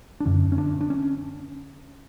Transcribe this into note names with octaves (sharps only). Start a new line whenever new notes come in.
D4
F#2 D3 C#4
C#4
D4
D4
C#4